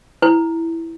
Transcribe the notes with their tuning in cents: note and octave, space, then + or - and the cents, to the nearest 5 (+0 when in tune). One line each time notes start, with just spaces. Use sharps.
E4 +0 B4 +40